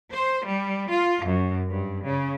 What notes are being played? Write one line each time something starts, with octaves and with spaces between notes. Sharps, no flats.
C5
G3
F4
F#2
G2
C#3